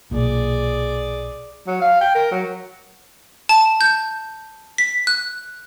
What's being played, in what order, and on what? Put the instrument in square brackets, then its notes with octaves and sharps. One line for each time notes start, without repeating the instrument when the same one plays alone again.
[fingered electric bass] B1 A#2 [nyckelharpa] G#4 D5
[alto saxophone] F#3
F5
G5
A#4
F#3
[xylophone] A5
G6
B6
F#6